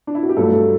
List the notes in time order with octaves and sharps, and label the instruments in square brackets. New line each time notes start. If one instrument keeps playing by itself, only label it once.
[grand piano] D4
E4
F#4
G4
G2 F#3 A3 A4